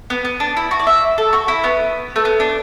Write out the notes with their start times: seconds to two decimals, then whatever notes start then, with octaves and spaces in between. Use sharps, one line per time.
0.10 B3
0.25 B3
0.40 D4
0.57 E4
0.71 F#4
0.79 D5
0.87 E5
1.18 A4
1.33 F#4
1.48 E4
1.64 B3
2.16 A3
2.25 B3
2.40 D4